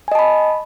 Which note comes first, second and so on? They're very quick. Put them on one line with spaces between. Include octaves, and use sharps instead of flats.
G#5 D#5 A5 B5